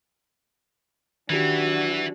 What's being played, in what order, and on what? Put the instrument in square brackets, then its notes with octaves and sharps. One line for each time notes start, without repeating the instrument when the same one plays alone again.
[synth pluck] D#3 F#3 G4 [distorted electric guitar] E3 [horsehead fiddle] D4 F#4